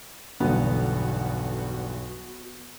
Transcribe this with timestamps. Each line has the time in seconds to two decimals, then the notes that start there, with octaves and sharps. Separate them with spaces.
0.40 B1 E2 G2 D3 B3 F#4